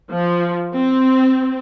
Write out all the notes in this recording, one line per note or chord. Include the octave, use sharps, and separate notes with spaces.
F3
C4